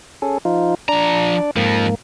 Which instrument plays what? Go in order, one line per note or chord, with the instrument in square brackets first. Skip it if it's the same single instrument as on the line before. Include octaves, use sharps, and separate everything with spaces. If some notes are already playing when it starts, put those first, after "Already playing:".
[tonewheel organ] C#4 G#4 A4
F3 D#4 F4
[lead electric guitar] F3 A#5 [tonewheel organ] D4 D5
[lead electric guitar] F2 F3 [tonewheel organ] G#2 A#3